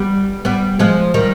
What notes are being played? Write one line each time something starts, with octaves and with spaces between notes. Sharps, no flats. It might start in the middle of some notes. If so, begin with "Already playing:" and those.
Already playing: G3 B3
G3 B3
F3 G#3
D#3 G3